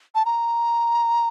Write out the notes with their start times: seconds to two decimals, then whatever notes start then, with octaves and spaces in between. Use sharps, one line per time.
0.15 A5
0.26 A#5